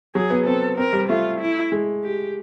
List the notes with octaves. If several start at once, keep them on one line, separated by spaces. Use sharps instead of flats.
F#3 G#4
B3
C4 A4
C4 A#4
G3
A3 F4
E4
G#3
G4